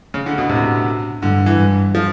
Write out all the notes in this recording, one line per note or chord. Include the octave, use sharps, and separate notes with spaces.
C#3
D3
B2
A2 C3
G2 D3
E3
G2
F3